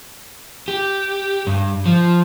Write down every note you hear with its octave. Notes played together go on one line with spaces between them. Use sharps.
G4
G2
F3